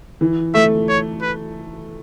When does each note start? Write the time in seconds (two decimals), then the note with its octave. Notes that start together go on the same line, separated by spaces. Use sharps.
0.21 E3
0.54 A3 E5
0.88 C#5
1.22 B4